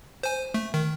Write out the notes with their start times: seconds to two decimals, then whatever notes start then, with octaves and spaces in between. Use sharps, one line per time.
0.23 C5 G#5
0.54 A3
0.74 D#3